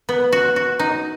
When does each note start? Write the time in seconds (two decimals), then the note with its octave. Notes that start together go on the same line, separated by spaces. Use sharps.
0.09 B3
0.32 F#4
0.56 F#4
0.79 D#4